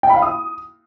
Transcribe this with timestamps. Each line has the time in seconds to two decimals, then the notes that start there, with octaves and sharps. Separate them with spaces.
0.03 G5
0.10 B5
0.16 F5
0.22 D#6